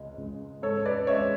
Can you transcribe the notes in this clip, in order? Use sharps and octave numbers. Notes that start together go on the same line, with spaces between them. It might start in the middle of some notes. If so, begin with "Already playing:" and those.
Already playing: C#2 G#3
C#2
G#2 A4 C#5
B4 D5
G#3 C#5 E5